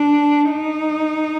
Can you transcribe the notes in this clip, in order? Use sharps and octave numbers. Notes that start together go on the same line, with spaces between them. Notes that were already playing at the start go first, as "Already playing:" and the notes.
Already playing: D4
D#4